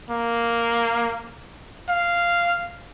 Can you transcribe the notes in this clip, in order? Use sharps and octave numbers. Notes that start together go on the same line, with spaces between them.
A#3
F5